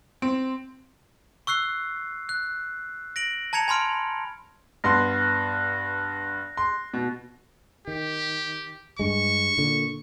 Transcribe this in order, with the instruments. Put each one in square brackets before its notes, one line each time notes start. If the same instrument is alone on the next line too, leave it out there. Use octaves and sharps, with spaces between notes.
[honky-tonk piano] C4
[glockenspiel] C#6 E6 F#6 C7
F#6
A#6 D7 F#7
A5 A#5 G#6 C#7 F7
G#5 B5 C6 F6 D7
[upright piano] G2 B3 C6 [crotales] F#6 A#6
[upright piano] C6
B2
[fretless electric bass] D#3 [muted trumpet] G4
[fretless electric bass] G2 G#3 [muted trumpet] C#6
[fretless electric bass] A#2 D3